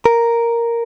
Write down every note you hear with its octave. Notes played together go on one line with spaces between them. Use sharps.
A#4